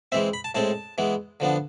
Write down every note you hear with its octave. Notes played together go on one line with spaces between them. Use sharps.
E3 G#3 C4 E5
B5
A5
A2 G#3 C4 A5
E3 G#3 B3
D3 F3 B3 D4